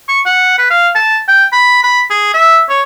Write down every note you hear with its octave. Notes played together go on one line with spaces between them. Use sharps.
C#6
F#5
B4
F5
A5
G5
B5
B5
G#4
E5
C#5